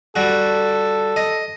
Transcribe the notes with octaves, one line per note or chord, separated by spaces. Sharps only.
G3 F#4 A4
D#5